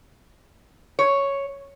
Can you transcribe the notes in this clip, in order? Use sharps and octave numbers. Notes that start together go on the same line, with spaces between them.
C#5